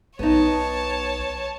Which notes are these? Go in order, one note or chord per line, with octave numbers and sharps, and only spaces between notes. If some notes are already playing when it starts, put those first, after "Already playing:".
B1 B3 D#4 C#5 A5